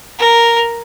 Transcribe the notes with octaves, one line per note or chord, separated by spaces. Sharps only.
A#4